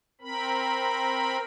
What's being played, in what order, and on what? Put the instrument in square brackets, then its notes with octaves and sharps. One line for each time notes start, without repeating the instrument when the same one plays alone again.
[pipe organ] C4 A#4 B5